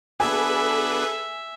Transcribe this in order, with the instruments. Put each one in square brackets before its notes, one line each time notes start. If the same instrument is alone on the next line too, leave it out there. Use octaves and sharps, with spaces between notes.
[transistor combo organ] B3 D4 F#4 [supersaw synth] G#4 A4 B4 [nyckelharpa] E5 [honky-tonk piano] G#5